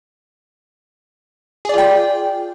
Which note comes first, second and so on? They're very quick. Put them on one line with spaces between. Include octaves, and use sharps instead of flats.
G#4 D5 F4 G5